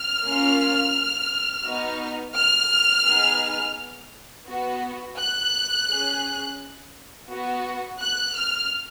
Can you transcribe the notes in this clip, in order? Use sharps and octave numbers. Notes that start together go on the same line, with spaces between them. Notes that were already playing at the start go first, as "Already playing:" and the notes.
Already playing: F6
A#3 C#4 F4
B3 D#4 F#4
F6
B3 D#4 G#4
B3 F#4
F#6
C#4 G#4
B3 F#4
F#6
F6